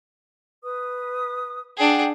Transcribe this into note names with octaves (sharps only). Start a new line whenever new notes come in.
B4 D#6
D4 G#4 F#5 G5